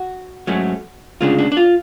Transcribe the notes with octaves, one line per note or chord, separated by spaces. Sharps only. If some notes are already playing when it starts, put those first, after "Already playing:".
Already playing: F#4
G#2 F#3 A3 C#4
D2 C#3 G#3 D4 F4
D4
D4
F4